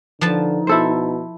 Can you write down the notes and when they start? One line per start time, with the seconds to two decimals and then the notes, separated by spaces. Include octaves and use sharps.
0.21 D3 F3 D#4 B4 A5
0.67 B2 E4 A4 C5